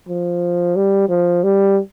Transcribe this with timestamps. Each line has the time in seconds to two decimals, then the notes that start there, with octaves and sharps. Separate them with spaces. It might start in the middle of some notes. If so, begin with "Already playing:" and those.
0.08 F3
0.76 G3
1.09 F3
1.44 G3